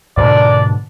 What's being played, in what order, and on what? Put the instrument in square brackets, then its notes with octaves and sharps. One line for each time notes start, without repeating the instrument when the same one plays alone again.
[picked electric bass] G#2 B2 D3 [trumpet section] D4 A#4 D5